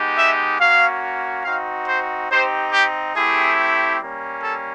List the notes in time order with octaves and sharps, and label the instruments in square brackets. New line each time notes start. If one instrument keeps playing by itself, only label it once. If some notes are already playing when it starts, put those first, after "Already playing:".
Already playing: [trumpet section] G#3 B3 D#4 G4
E5
A#3 C#4 F#4 F5
C4 D#4 F#4 F5
C5
C4 D#4 G4 C5
G4
A3 C4 E4 G4 G#4
G3 A#3 C#4
A4